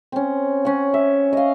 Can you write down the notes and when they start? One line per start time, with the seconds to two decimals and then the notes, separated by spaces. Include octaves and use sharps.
0.12 C4 C#4
0.65 C#4 F#5
0.94 E5
1.33 D#5 F5